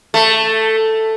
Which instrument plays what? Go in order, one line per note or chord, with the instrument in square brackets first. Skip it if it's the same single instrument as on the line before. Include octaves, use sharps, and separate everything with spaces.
[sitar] A3